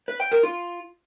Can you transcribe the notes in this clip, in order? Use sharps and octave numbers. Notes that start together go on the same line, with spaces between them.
B4
G5
A#4
F4